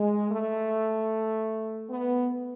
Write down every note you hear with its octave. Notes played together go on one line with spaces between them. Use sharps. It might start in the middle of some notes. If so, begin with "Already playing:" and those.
Already playing: G#3
A3
B3